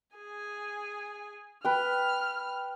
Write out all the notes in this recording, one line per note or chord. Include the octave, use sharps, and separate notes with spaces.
G#4 G#5
B4 G5 F6